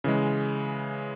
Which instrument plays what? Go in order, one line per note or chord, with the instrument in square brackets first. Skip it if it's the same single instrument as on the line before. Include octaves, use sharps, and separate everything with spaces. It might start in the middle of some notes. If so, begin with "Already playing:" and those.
[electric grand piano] C#3 E3 G#3